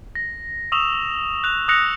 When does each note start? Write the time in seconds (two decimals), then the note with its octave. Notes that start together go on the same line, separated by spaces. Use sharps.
0.15 A#6
0.72 C#6 D#6 E6 E7 F7
1.44 F#6 F7
1.68 D#6 E6 F#6 A#6 C#7 F7